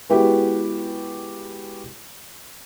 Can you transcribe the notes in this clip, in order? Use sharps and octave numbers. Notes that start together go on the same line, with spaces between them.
G#3 B3 E4 F#4 G4 B4